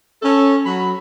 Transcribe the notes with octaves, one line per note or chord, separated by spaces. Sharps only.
C#4 A4
F#3 B5